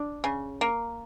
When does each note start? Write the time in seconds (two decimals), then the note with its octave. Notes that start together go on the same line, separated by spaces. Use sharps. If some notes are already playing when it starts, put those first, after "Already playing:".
Already playing: D4
0.24 C#3
0.61 A#3